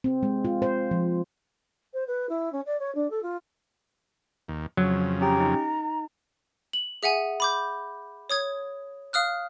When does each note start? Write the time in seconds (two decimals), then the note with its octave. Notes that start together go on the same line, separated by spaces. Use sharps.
0.04 C4
0.23 G#3
0.45 F4
0.62 C5
0.91 F3
1.93 C5
2.07 B4
2.29 E4
2.52 C#4
2.65 D5
2.79 C#5
2.94 D4
3.10 A4
3.22 F4
4.48 D#2
4.77 F2 C#3 F#3
5.21 C#4 G4 G5 A#5
5.40 D#4
6.73 F#7
7.03 G#4 E5 F#5 G#5
7.40 B5 D6 G6
8.30 C#5 D#6 G#6
9.13 F5 D#6 F6 F#6